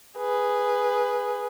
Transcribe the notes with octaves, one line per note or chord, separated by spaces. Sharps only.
G#4 B4